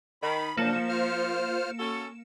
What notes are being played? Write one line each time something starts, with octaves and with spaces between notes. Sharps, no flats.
D#3 B5
C#3 F3 F#3 A#3 D4 C#7 E7
F4 C5 F6
C#4 F#4 A4